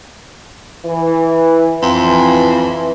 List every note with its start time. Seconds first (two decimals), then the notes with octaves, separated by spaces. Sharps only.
0.84 E3
1.82 F2 E3